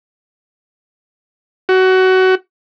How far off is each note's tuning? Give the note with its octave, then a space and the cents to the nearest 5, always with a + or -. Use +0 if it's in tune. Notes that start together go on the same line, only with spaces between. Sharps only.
F#4 +20